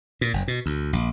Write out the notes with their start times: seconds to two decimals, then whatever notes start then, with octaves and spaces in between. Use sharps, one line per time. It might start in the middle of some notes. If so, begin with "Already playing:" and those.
0.21 A#2
0.33 F#1
0.48 B2
0.66 D2
0.93 A#1